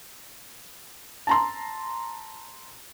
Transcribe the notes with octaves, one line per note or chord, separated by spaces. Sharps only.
A5 A#5 C6